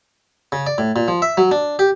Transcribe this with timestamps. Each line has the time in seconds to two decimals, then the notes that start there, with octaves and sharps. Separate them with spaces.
0.52 C#3
0.67 D5
0.78 A2
0.96 A#2
1.08 F3
1.22 E5
1.37 F#3
1.51 D4
1.79 G4